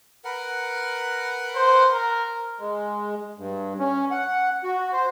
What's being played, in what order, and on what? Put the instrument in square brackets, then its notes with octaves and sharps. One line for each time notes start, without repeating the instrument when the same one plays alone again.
[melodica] A#4 B4 F#5
[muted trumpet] C5
A#4
[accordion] G#3
G2
C#4
F#5
F#4
C5